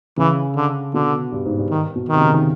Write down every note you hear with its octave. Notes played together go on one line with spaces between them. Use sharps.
C#3 E3
D3
B2 D3
G2
G#2
G2
D#3
B2
C3 D#3
C#3
D#3